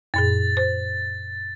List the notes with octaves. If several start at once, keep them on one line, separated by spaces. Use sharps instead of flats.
F#2 A#2 G#4 A6
C5